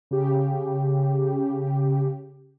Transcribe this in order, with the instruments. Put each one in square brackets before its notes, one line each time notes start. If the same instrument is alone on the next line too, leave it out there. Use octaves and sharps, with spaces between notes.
[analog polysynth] C#3 G4